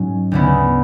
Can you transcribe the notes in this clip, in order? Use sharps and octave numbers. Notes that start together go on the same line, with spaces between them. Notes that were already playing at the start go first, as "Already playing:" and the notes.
Already playing: G#2 F#3 C#4
D2 C#3 G#3 B3 E4